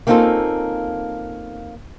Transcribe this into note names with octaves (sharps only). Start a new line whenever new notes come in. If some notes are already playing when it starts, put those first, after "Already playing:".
A#3 C4 C#4 D#4 F4 A4